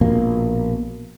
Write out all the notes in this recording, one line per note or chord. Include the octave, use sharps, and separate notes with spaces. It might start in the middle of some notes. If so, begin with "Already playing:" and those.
A#1 B2 A#3